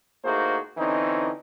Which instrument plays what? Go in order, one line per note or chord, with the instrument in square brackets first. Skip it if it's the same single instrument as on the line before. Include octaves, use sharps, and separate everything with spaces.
[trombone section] A2 A#3 D#4 F#4 G#4 C5
D3 E3 C4 C#4 D#4